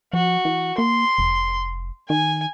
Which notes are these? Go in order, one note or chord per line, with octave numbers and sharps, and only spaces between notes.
F3 F#4
E3
A#3 C6
F1
D#3 G#5